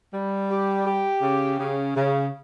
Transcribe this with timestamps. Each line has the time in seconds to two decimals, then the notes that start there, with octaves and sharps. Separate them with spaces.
0.14 G3
0.50 G4
0.86 G4
1.22 C#3
1.59 C#3
1.96 C#3